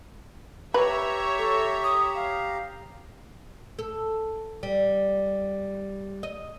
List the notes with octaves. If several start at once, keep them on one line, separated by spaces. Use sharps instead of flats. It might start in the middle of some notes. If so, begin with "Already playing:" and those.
G4 B4 C#5 E5 A#5
A4
D#6
F5
A4
G3
D#5